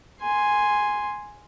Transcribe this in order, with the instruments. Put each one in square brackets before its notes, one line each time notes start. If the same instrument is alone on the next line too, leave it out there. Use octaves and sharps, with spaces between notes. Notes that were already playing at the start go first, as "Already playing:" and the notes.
[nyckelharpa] G#5 C6